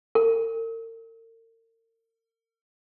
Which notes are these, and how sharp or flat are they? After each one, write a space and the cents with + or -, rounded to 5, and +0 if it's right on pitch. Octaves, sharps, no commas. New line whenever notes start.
A#4 -45